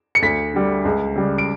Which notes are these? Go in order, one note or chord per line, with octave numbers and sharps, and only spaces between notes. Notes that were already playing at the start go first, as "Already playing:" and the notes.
C#7
D2 B6
D3 G3
C#2
C#3 G3
D7